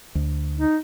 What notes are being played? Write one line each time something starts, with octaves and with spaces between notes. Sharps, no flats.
D2
D#4